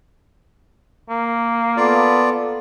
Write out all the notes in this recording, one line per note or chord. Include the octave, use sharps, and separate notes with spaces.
A#3
B3 F4 A4 D5